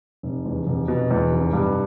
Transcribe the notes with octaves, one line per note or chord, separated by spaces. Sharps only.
F1
E2
F1
B2
E2
F1
G2